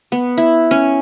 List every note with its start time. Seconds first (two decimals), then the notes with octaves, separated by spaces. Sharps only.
0.12 B3
0.37 E4
0.71 C#4